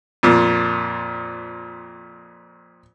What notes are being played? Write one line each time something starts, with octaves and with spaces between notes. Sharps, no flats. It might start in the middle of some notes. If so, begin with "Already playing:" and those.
F2 A#2